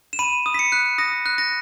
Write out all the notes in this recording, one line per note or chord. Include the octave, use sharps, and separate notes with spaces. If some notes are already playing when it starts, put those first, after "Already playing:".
E7
B5 D#7
D#6
B6
C#7
F#6
D#6 A#6
F#6
A#6